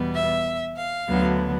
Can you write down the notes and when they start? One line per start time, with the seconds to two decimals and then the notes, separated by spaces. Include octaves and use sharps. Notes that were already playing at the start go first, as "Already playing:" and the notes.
Already playing: E2 B2 G3 B3
0.14 E5
0.76 F5
1.09 D2 D3 F#3 B3